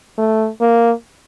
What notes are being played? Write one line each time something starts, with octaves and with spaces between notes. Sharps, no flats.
A3
A#3